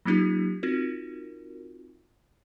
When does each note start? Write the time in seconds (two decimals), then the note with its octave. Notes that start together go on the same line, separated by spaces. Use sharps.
0.05 F#3 A#3 C#4 D#4 F4 G4
0.63 C4 D#4 F4 F#4 A#4